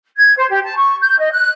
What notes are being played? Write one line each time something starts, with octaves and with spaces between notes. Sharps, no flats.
G#6
C5
G4
A5
C#6
G6
D#5
F#6